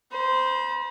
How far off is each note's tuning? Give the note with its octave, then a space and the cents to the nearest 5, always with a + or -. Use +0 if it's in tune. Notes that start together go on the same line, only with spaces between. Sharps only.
C5 -10 B5 -45